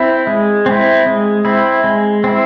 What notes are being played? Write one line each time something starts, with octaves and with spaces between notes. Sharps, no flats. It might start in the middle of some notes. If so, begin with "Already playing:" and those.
Already playing: C4 E4
G#3
C4 E4
G#3
C4 E4
G#3
C4 E4